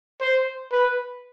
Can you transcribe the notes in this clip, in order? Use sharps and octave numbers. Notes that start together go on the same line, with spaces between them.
C5
B4